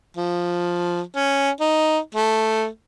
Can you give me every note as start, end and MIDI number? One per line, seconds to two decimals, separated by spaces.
0.17 1.01 53
1.16 1.50 61
1.60 1.99 63
2.15 2.66 57